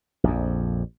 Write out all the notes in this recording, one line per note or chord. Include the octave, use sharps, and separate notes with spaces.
A#1 F2